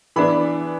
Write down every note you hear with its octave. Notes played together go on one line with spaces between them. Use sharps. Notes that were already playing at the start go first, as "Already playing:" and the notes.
E3 B3 D4 B5